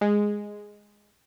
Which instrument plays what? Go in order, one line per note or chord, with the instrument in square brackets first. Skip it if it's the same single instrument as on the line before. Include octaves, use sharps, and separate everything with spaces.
[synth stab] G#3